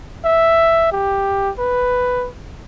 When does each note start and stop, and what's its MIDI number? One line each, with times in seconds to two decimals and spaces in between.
0.25 0.88 76
0.92 1.51 67
1.59 2.28 71